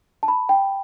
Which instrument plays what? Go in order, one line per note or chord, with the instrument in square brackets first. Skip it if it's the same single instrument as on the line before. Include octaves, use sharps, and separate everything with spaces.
[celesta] A5
B5
G5